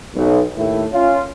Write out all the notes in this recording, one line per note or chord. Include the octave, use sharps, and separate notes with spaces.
B1
D#2 A2 A3 E4
C#4 F4